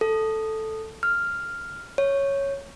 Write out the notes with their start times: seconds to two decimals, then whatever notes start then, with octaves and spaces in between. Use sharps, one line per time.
0.01 A4
1.03 F6
1.98 C#5